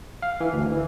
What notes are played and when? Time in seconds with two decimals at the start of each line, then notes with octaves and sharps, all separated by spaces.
0.22 F5
0.40 E3
0.53 D2
0.71 E3